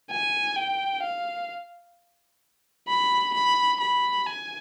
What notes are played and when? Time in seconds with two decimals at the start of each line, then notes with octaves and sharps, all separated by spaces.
0.10 G#5
0.56 G5
1.03 F5
2.89 B5
3.35 B5
3.81 B5
4.27 G#5